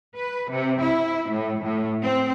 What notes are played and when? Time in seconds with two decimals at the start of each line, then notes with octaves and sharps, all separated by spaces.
0.14 B4
0.51 C3
0.81 E4
1.30 A2
1.63 A2
2.01 C4